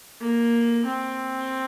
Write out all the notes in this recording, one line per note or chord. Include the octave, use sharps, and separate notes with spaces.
A#3
C4